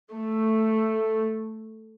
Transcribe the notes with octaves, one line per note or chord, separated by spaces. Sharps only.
A3